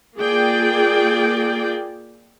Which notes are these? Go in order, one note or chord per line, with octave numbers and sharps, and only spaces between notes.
A#3 F4 G#4 D5 G5